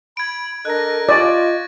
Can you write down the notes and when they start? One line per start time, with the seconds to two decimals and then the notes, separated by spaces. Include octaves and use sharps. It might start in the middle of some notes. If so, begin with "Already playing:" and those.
0.17 B5 G#6 D7
0.65 D4 A4 A#4 D#5 F#6 A#6
1.09 F4 D5 C#6 A6